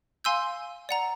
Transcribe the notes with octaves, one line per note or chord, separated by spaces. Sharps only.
F5 G#5 C6 E6 G6
D5 F#5 A#5